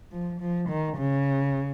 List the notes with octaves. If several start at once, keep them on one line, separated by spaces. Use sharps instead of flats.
F3
F3
D#3
C#3